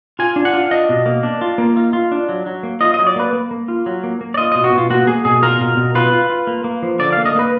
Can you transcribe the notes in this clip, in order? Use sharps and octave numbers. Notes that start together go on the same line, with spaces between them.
F4 G#5
D4
F#5
F4
D4 D#5
B2
A#3
D4
F4
A#3
F4
F4
D4
F#3
F#3
A#3
F4 D#5
F#3 D#5
D5
A#3 B4
A#3
A#3
F4
F#3
A#3
A#3
D5
F4 D#5
B2 D#5
F#4
B2
F4
A#3 F#4
A#3 G#4
B2 G#4
F4 A#4
B2
B2
F4 B4
F4
F4
A#3
A#3
F3
D3 D5
A#3 F5
D#5
A#3 B4